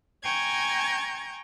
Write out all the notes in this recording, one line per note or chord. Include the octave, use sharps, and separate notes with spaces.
G5 G#5 A#5 C#6 G#6